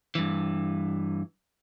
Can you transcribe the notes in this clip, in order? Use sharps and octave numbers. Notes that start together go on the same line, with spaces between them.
G2 E3